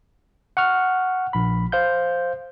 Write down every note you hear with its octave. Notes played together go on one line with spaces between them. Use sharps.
F#5 C#6 F6
A#1 B5
C5 F5 G6